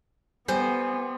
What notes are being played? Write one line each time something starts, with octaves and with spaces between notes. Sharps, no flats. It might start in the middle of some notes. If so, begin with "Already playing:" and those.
G3 B3 C5 G#5